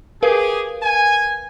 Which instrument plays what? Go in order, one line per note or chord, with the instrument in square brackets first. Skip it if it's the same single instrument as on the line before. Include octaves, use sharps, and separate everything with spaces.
[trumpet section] G4 G#4 [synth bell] A#4 B4 F5
[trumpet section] G#5